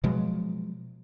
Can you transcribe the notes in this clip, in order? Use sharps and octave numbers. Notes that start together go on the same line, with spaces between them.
B2 F3 F#3 G#3